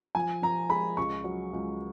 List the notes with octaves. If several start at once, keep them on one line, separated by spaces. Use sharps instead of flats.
F3 G#5
F3 A#5
G#3 B5
C#2 C#6
F#3
C#2